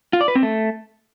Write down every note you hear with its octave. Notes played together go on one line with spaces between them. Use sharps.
F4
D5
B4
C4
A3